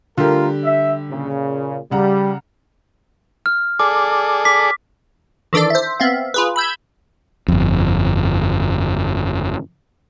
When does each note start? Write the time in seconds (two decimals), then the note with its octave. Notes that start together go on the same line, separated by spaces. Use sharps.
0.18 D3 G3 A3 F4 G4 A#4
0.63 E5
1.10 A#2 C#3
1.91 C#3 G3 F#5 A#5
3.46 F6
3.79 G#4 A4 D5 D6
4.45 D6 B6
5.53 D#3 E3 D4 A4 D5
5.70 C5 E5
6.00 B3 C4 E5 F5
6.34 F4 G#4 B4
6.56 B5 E6 G6 G#6
7.48 G1 F2